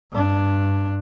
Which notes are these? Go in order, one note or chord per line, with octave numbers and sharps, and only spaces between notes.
G2 D4